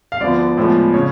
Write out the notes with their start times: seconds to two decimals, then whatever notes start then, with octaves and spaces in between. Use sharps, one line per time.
0.12 F5
0.21 D2 D3 F3 B3 D5
0.57 A2 F3 G#3 B3
0.94 C#3 C#5